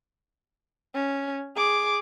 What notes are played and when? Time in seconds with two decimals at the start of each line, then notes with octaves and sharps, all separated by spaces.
0.95 C#4
1.56 G#4 D6